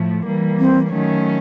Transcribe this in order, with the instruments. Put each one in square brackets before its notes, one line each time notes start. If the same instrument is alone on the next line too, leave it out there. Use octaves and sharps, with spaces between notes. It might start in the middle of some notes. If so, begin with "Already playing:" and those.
Already playing: [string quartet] A2 F3 A3
E3 G3 A#3
[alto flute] C4
[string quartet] D#3 F#3 A3 C#4